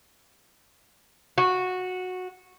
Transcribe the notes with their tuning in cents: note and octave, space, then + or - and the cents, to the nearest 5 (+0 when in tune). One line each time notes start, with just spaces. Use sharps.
F#4 -10